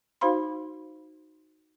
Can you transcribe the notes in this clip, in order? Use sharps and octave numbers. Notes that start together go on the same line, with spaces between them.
D#4 F#4 C5 F5 B5 C6